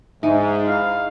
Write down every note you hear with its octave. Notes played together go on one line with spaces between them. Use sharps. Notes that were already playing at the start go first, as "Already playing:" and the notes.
G#2 D#4 E5 G#5
E4 F5 B5